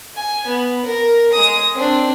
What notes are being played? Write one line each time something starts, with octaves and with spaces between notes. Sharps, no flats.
G#5
B3
A#4
G#3 D#6
C4 D4